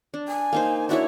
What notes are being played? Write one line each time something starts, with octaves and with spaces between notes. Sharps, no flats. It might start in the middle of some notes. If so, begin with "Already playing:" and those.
D4
G#5
A#3 D#4 C5
D4 E4 F#4 C#5